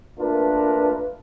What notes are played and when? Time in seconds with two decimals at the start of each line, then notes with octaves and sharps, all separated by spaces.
0.19 A3 A#3 D4 F4 A#4 B4